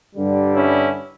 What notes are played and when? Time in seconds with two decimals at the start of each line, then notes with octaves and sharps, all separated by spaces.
0.14 G2 D3 G3
0.55 C#4 E4